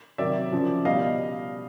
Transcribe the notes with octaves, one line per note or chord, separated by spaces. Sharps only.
C3 D#3 F#3 D5 E5
C#3 F3
B2 G3 D#5 F5